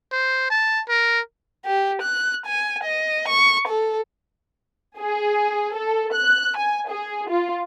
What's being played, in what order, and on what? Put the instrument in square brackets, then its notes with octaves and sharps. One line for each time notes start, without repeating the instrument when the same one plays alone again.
[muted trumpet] C5
A5
A#4
[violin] G4
F#6
G#5
D#5
C#6
A4
[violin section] G#4
A4
F#6
G#5
G#4
F4